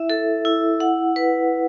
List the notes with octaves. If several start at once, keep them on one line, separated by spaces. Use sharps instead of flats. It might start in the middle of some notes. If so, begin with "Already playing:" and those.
Already playing: E4 E5
A4
E4
F#5
B4